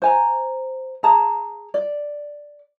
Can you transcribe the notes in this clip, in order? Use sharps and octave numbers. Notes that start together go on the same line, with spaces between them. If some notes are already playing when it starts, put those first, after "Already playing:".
C5 G#5 A#5
G#4 A5 A#5
D5